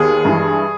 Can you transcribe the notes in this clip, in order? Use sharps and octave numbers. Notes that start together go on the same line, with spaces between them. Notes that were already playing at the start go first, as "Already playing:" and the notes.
Already playing: D#2 D#3 B3 G#4
G2 E3 G#3